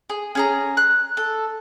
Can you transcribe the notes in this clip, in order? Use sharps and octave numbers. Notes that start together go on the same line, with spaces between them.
G#4
C#4 G#4 A#5
F#6
A4